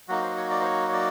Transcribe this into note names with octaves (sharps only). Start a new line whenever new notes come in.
F#3 A#3 D#4 F#4
C5
C#5
D5
C5
C#5
C#5
D5